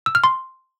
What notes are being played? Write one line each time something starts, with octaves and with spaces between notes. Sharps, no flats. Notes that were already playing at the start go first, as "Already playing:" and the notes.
E6
F6
C6